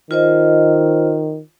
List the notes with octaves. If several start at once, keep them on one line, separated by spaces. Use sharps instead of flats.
D#3 F4 C5 D#5